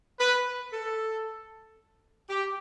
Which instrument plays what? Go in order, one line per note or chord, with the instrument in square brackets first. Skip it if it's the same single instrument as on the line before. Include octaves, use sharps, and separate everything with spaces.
[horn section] B4
A4
G4